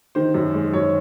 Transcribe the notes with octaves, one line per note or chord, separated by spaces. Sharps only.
D#3 C5
F#2
G#3
F#2 C#5